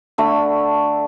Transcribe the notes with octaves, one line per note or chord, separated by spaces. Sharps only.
D3 A3 B5